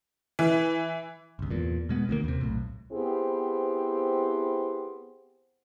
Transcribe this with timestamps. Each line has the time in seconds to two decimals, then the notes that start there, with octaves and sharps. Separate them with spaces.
0.39 E3
1.39 G1 C#2
1.51 E2 A#2
1.89 B2 G#3 B3
2.09 D2 D#3 A#3
2.24 D#2 C3
2.41 B1 A2
2.92 B3 C4 E4 G4 G#4 C5